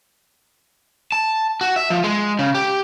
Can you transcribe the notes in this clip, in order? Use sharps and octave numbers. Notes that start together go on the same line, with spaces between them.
A5
F#4
E5
F3
G#3
C#3
G4